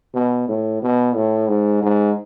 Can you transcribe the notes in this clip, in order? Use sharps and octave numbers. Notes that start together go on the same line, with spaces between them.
B2
A2
B2
A2
G#2
G#2